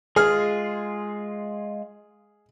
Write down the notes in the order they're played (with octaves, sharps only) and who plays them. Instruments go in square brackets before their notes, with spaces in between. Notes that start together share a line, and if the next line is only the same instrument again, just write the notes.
[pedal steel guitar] G#3 F4 [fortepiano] G#4 F6